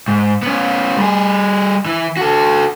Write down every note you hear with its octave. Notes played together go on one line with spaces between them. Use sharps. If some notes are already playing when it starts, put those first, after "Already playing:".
G#2
B3 C#4
G3 G#4
E3
F#4 A4